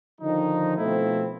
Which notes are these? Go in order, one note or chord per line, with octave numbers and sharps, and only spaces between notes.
D3 D#3 F3 D#4
B2 F3 A3 C4 E4